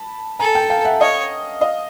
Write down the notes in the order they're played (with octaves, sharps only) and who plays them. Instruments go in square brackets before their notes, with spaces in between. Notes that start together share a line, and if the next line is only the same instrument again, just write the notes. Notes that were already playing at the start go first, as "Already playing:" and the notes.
Already playing: [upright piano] A5 B5
[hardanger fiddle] A4 [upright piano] G#5 A#5
[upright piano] G5 A5
F5 G5
E5 F#5
[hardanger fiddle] C#5 [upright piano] D#5 F5
[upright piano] D#5 F5